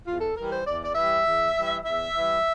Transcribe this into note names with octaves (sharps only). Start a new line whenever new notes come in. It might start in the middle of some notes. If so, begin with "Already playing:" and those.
E2 F4
A4
E3 G3 A#4
C5
E2 D5
D5
E3 G3 E5
E2
E3 G3
E2 E5
E3 G3